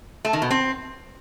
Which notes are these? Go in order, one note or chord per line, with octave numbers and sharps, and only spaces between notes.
A3
D#3
B2
C4